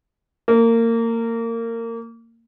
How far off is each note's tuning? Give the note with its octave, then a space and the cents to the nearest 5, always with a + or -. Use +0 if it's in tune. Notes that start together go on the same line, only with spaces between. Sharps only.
A#3 -25